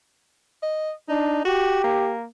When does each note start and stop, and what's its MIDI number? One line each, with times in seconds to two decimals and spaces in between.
0.63 0.92 75
1.09 1.43 62
1.09 1.41 63
1.45 1.84 66
1.45 2.14 67
1.84 2.25 58